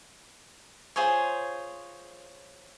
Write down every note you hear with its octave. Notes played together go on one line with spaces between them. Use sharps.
F4 G#4 C5 C#5